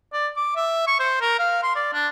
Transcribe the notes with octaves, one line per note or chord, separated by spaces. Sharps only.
D5
D6
E5
C#6
C5
A#4
F5
C6
D5
D4